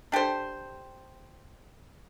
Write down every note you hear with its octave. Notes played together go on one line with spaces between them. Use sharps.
D4 G4 A4 C5